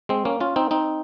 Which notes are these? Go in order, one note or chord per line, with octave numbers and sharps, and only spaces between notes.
G#3 C4
A#3 C#4
C#4 F4
C4 D#4
C4 D#4